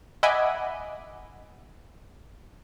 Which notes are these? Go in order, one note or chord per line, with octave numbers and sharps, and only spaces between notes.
D#5 E5 F#5 G#5 B5 D6